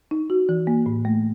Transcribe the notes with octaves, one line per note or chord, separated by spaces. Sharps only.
D#4
F#4
E3
A#3
A2
A3